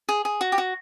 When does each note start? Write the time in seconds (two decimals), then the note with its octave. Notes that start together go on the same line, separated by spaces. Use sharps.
0.09 G#4
0.25 G#4
0.41 F#4
0.52 G4
0.58 F#4